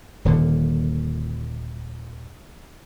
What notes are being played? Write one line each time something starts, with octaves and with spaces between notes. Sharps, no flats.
D#1 A#2 D3 D#3